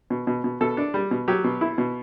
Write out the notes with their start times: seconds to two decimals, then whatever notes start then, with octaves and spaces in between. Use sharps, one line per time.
0.10 B2
0.27 B2
0.44 B2
0.61 B2 A4
0.77 D4
0.94 G3
1.11 B2
1.28 F#3 G4
1.44 B2
1.61 E4
1.78 B2